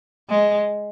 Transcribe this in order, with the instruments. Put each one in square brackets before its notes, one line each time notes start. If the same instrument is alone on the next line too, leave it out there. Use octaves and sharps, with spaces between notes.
[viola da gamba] G#3